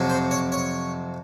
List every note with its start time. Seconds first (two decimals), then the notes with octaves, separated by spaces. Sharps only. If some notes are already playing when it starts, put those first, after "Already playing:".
Already playing: F2 C3 F#3
0.10 C5
0.31 C#5
0.52 C#5